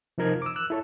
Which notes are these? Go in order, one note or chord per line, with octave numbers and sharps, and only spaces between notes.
C3 F3 D#4 A#4 G#6
D6 E6
E6 F#6
E4 A4 C#5